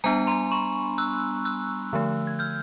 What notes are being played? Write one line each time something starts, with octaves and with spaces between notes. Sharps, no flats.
G3 B3 D4 G#5 A#5
A#5 C6
B5 C#6
E6 F#6
E6 F#6
D3 F3 A3
G#6
F6 G6